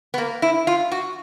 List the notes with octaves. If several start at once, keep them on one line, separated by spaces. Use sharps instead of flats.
B3
A#3
E4
F4
F#4